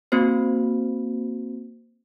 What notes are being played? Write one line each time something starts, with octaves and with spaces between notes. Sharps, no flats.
A#3 C4 F#4 C5